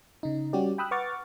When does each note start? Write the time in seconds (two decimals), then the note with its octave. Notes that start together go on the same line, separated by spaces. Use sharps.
0.23 C#3 D#4
0.53 G3 C#4 F#4 G4 D5
0.78 G5 B5 D#6 E6 F#6
0.91 B4 F#5 C#6 D6 F6 A6